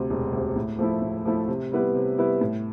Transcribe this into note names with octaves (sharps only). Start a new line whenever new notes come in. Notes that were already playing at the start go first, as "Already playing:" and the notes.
Already playing: D2 C3
E1
D2 C3
A2
F3 A3 E4
A2
F3 A3 E4
C3
G3 B3 E4 B4
C3
G3 B3 E4 B4
A2